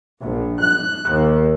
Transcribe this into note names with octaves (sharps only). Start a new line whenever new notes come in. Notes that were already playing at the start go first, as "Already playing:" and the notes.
A#1
F#6
D#2